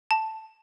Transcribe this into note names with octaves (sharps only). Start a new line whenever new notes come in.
A5